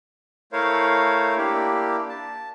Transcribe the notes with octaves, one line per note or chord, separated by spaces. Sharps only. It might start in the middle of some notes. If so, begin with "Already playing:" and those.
A3 E4 A#4 C5 C#5 F5
A#3 D4 E4 G4
A5